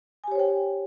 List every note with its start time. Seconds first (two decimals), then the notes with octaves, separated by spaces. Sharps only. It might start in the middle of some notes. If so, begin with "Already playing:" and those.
0.24 G#5
0.28 G4
0.32 C#5
0.35 C5
0.39 G5